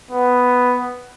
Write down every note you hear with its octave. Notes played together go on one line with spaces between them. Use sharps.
B3